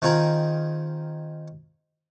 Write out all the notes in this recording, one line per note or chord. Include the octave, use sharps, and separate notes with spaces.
D#3 C4 F4 G#4 A#4